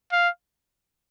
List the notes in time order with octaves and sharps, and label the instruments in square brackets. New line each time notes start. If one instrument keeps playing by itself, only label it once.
[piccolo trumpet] F5